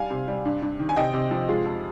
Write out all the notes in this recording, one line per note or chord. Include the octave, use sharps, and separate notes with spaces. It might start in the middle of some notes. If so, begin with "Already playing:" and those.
Already playing: G3 F5 G#5
C3
G3
G2
G2
D#3
G#5
C3 D#5 G5
C3
F3
G#3 F4 G#4
F2